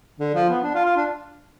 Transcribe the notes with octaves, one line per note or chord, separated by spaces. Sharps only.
D3
F3
B3
D4
F4
F4
D4